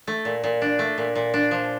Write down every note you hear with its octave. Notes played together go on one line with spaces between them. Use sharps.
A3
A#2
A#2
D4
A3
A#2
A#2
D4
F3